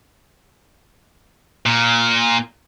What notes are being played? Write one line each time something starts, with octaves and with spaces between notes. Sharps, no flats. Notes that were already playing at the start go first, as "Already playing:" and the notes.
A#2